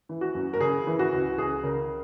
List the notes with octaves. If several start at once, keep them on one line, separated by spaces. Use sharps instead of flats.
E3
F#4
F#2
A#4
C#3 G#4
E3
F#4
C#2
C#2 G#4
C#3 A#4